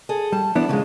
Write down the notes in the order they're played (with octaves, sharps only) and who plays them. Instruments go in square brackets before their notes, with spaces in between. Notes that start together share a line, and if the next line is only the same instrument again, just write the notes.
[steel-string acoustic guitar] G#4 A4
[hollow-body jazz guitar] G3 [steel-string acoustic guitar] A5
[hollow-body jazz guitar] E3 B3 D4 [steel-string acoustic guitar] E4
[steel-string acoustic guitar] G#2 F4 [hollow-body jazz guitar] C#3 G#3